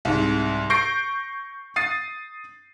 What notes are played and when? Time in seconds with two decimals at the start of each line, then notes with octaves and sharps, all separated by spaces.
0.05 C2 G#2
0.70 C#6 G6 A#6 C7 D7
1.76 D#6 A6 C7 D#7